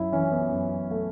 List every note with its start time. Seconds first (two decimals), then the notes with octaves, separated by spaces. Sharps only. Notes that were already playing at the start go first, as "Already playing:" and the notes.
Already playing: F#2 E4
0.12 E3 C#4
0.32 B3
0.52 F#2
0.91 A3